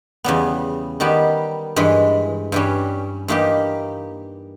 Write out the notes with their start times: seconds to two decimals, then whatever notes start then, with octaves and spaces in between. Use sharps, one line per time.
0.24 E2 C#3 G3 B3
1.00 D#3 G3 B3 G4
1.76 G2 E3 G#3
2.52 G2 E3 G3 C#4
3.28 G2 E3 A#3 D#4 G4